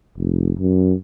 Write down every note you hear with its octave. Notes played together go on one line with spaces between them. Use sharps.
F1
F#2